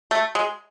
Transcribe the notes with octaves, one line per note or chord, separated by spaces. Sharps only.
A3
G#3